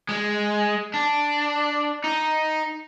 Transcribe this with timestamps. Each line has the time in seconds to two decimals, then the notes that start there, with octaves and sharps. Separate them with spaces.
0.09 G#3
0.94 D4
2.04 D#4